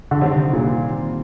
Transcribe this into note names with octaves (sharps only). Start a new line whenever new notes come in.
D3
C3 D#3 G3 C4
A#2